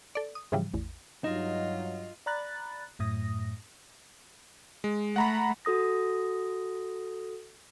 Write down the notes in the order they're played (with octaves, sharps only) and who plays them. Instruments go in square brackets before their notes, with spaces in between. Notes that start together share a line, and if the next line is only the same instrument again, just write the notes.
[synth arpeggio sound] A4 D5
D#6
G#2 C#3 E3 F3 G3
A1 E2
[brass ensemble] G2 F#3 [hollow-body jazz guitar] D#4 [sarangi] F4 [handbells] D#5
[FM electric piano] D5 A#5 B5 F#6 A6
F#2 A2 D#6 A#6
[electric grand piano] G#3
[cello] A3 [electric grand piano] F#5 A#5 B5
[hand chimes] F#4 A4 D#6 A#6